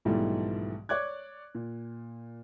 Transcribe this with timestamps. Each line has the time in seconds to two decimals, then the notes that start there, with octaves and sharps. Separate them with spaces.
0.05 B1 G#2 E3 F3 G3 A3
0.89 C#5 D5 D6 F#6 G#6
1.55 A#2